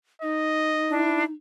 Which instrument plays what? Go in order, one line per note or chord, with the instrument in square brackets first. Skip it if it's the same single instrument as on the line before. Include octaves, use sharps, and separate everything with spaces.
[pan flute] D#4 [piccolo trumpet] D#5
[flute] D4 [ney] E4